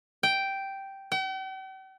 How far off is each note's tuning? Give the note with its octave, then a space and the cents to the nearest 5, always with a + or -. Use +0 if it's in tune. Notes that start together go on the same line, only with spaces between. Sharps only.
G5 -5
G5 -45